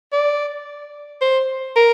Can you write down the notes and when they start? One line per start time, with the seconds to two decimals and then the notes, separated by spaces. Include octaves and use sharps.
0.13 D5
1.21 C5
1.76 A#4